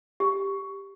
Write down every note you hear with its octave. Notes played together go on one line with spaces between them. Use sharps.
G4